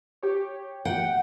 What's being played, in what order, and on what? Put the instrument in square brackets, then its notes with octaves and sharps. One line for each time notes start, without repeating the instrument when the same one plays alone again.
[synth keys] G4 C#5
[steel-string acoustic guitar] F#5 [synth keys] G5